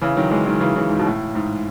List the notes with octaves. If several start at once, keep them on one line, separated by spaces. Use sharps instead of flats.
C#3 E3
D#3 F#3
E3 G#3
D#3 F#3
C#3 E3
C#3 E3
G#2
B2
A2
G#2